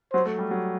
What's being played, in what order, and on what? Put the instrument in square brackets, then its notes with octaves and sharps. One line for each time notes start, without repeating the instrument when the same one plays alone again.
[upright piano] F#3 [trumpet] C5
[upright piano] A3
G3
F#3